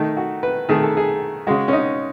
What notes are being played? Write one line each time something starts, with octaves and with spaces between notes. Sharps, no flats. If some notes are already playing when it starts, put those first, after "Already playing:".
Already playing: D#3 A3 D#4
F#4
B4
D#3 A3 G#4
A4
G#4
C#3 G#3 F#4
C#4
D#4